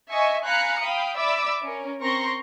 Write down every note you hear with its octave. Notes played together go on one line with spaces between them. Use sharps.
D#5 E5 G#5 C#6
F5 G#5 A#5 B5 F#6 C#7
F5 G5 B5 D#6
D5 E5 B5 D6 E6
C#4 A#4
C4 A#4 A#5 C6 C#6 A#6